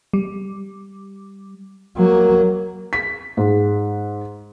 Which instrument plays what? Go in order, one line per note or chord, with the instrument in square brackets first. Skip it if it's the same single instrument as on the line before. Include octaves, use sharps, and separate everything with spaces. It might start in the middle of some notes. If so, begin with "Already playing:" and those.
[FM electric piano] G3
[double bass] F#3 A#3
[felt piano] B6
G#2